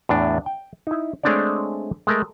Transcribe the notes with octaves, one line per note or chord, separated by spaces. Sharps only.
E2 A2 D4
G5
D#4 E4
G#3 A3 C4 D4 C#5 D5
G#3 A3 A#4